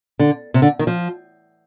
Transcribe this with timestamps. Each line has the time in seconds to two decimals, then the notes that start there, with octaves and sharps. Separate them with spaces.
0.20 D3
0.54 C3
0.62 D3
0.79 D#3
0.87 F3